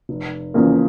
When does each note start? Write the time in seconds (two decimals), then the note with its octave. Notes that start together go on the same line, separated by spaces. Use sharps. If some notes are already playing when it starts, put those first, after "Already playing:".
0.09 F1
0.54 E2 C#3 F3 A#3